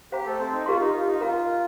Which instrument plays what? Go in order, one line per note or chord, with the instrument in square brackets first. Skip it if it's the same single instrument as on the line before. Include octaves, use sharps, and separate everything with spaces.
[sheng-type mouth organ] G4 [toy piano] C5 F5 A#5
[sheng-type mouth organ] A3 A4
C4 C5
D#4
[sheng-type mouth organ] F4 [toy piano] G4 A#4 F5 C6
[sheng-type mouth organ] D#4
F4
D#4
[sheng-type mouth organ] F4 [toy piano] A#4 F5 A#5